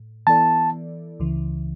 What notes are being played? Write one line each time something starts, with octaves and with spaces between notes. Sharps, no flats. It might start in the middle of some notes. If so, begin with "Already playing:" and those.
Already playing: A2
E3 B3 E4 A4 D5 A5
C#2 C#3 E3